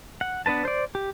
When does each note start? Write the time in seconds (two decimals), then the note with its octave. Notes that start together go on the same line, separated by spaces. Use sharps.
0.21 F#5
0.46 B3 D4 B4 A5
0.65 C5 D5
0.95 G4